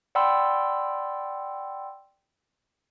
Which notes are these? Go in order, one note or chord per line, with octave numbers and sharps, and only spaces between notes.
D5 F#5 G5 B5 C6 E6